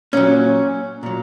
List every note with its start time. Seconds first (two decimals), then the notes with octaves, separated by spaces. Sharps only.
0.13 A#2 F#3 C#4
1.03 A#2 F#3